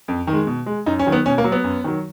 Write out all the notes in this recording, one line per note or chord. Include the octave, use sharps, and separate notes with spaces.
F2
D#3
G#3
B2
G#3
F#2 D#4
C#4
D#3 F#3
B3
B2 C#4
A#3
F#3
B3
F#2
D#3 F#3